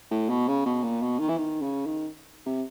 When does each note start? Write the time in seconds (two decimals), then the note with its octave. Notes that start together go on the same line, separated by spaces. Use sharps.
0.11 A2
0.29 B2
0.48 C#3
0.66 B2
0.83 A#2
1.02 B2
1.20 D#3
1.29 E3
1.38 D#3
1.62 C#3
1.86 D#3
2.46 C3